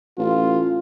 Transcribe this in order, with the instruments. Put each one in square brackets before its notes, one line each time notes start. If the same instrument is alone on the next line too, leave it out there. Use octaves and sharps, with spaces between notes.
[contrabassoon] A1 [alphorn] F4